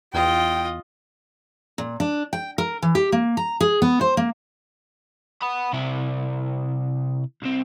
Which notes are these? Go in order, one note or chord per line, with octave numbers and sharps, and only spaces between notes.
E2 F4 D#5 G5
A#2
D4
G5
A#4
E3
G4
A#3
A#5
G#4
B3
C5
A#3
F#5 B5
C3 E4
C2 C4